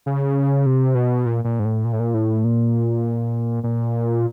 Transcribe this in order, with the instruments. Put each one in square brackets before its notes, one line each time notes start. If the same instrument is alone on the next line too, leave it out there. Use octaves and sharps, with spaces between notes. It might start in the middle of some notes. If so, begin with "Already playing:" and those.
[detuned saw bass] C#3
C3
B2
A#2
A#2
G#2
A2
A#2
A2
A#2
A2
A#2
A#2